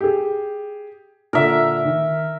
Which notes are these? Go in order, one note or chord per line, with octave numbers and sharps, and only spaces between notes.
G4 G#4
A#2 D3 A#4 E5
D#3